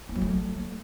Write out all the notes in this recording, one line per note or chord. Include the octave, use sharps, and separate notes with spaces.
A#3
F#3
A3